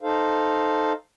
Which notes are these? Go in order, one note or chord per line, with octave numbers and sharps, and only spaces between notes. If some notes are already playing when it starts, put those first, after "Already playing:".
D#4 A4 C5 F5